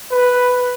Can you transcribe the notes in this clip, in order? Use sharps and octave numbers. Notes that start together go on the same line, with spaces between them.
B4